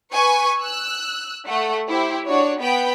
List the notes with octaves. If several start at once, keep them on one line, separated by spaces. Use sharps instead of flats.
B4 G#5 C#6
E6 F#6
A3 F#5
E4 G4 C5
D4 F#4 C#5
B3 G5 B5